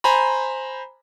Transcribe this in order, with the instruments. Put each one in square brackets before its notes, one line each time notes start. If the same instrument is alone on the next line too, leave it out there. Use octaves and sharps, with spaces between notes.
[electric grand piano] C5 G#5 A#5 B5